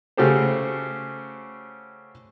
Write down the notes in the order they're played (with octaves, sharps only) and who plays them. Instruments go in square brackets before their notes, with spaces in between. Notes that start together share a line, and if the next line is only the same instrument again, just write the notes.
[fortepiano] C#3 A3 F#4 G4 A4 C5